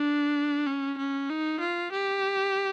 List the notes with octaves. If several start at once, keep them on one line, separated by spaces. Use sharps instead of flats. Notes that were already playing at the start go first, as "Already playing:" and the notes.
Already playing: D4
C#4
C#4
D#4
F4
G4